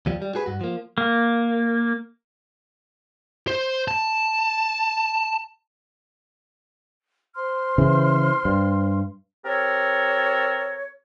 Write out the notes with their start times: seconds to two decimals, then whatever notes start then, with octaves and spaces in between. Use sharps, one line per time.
0.06 D#2 F3 G3
0.22 G3
0.35 F#4 G#4 B4
0.46 G2 F#4
0.61 F3 A#3
0.98 A#3
3.47 C5
3.88 A5
7.35 C5 C6 F6
7.78 C#3 E3
8.45 G2
9.44 C4 G4 A4 A#4 C#5